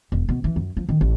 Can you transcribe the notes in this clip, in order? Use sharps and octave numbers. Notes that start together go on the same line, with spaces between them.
E1
B2
E3
F#2
F3
D#3
A1